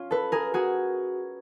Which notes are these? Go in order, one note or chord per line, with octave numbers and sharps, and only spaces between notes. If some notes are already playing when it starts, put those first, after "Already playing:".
Already playing: C#4 F4
A4 B4
G#4 A#4
F#4 G#4